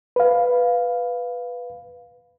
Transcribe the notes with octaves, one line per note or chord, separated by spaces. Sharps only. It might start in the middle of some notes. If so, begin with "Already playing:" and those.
B4 F5